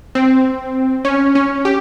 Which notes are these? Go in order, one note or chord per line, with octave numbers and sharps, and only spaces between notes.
C4
C#4
C#4
G4